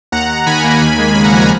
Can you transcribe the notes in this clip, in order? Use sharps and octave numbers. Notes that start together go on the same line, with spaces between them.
D#2 F#5 A#5
D#2
D#3 G#5 B5
A#3
D#2
G#3
C#3 G#5 B5
F#5 A#5
F3 G#5 B5
F#5 A#5